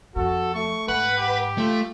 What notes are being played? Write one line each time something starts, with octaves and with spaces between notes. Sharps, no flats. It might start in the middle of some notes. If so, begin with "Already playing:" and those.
F2 F#4 A4
A3 C#6
G#2 B4 F#5
G4 F#5
A3 F4